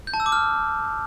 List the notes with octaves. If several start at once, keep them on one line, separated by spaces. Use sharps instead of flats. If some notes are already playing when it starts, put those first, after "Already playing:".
G6
A5
E6
D6
F6